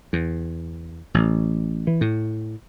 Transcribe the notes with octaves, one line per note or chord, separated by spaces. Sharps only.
E2
A1
E3
A2